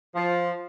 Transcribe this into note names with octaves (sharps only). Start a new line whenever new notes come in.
F3